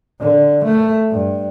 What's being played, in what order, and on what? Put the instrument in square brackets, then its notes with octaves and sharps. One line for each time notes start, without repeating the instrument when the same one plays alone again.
[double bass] D3
A3
G2